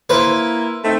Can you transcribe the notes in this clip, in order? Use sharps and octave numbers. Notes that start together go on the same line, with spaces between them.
A#3 E4 B4 C5
A3 C4 D#4